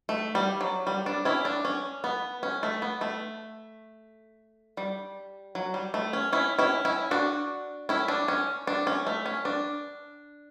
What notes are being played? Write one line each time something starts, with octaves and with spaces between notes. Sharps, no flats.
A3
G3
F#3
G3
D4
C#4 E4
D4
C#4
B3
C#4
A3
B3
A3
G3
F#3
G3
A3
C#4
C#4 E4
C#4 E4
C#4 E4
D4 F#4
C#4 E4
D4
C#4
D4
C#4
A3
C#4
D4